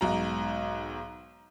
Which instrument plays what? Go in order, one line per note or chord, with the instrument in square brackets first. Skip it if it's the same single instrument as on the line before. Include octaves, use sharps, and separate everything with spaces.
[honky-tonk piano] B1 G#2 F#4 A#5